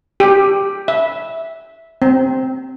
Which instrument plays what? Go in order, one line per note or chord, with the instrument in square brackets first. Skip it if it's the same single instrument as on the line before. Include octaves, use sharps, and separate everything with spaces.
[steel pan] G4
E5
C4